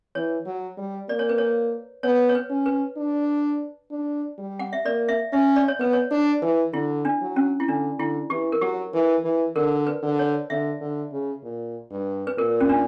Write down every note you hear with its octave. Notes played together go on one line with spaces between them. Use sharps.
E3 C#5
F#3
G3
A#3 D5
C#5
B4
C#5
B3 C#5
C#5
B4
C#4
B4
D4
D4
G3
F#5
E5
A#3 D5
E5
C#4 E5
D5
C#5
B3 B4
C#5
D4
E3
D3 E4
D4
F#3
C#4
E4
D3 D4
D3 E4
E3 G4
A#4
F#3 G4
E3
E3
D3 A#4
B4
D3
C#5
D3 E5
D3
C#3
A#2
G2
B4
A#2 A#4
C#4
D4